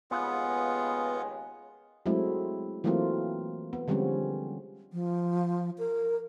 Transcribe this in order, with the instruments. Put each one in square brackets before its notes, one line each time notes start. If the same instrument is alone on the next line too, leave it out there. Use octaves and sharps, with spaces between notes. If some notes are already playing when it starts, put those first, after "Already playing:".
[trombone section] D#2 C#3 G#3 [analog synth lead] B3 [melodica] F4 G#4 F#5
[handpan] F#3 G#3 A3 C4 E4
E3 F#3 A3 A#3 C4 F4
B3
D3 F3 G3 G#3 C4 C#4
[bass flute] F3
A#4